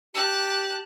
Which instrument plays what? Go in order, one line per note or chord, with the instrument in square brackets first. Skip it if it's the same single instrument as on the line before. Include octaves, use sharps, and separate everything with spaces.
[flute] G4 [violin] A5 F#6